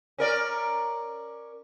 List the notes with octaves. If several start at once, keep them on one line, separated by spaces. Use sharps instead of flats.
C#4 A#4 D5